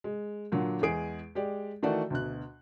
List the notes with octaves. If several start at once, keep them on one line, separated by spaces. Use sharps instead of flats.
G#3
A#2 D3 F#3
E2 G#3 G#4 D7
G#3 G4 D5
D#3 E3 A3 F#4 D5
D2 B2 F#6